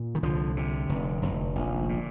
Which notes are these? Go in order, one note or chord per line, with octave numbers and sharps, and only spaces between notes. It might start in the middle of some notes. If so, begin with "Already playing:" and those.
Already playing: A#2
D#3
C2 D3 F3
C3
F1
F1
A#1
A#2